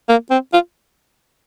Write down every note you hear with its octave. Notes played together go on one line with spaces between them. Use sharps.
A#3
C4
F4